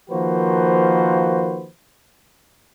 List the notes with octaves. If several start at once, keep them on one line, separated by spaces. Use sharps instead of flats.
D#3 F3 A#3 F#4 B4 C5